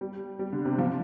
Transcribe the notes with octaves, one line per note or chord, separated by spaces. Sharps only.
G3
G3
D3
C3
F3